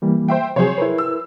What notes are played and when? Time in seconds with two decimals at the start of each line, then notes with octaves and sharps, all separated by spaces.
0.02 E3 G3 A#3
0.28 C5 E5 G5
0.56 C3 F3 F#3 G#4 C5 C#5
0.78 E4 A#4 B4
0.98 E6